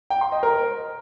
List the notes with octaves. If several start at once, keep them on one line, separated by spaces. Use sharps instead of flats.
G5
C6
D#5
A#4